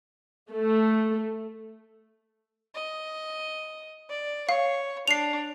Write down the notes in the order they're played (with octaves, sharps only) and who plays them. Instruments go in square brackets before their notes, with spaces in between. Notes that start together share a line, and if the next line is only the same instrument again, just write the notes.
[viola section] A3
[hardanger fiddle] D#5
D5
[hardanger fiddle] C#5 [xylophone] F5
[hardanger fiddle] D4 [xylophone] C7 F7